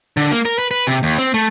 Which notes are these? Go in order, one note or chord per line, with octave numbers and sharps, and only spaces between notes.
D3
A#3
A#4
B4
B4
C3
D#2
C4
A3